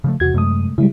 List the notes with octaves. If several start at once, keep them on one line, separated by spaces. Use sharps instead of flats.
C#3 F3 A3
E2 C3 F#4 G#6
F#2 C3 G#3 A3 D#6
C#3 G3 G#3 E4